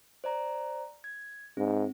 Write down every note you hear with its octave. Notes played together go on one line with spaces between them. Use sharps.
C5 D5 A#5
G#6
G#2 C4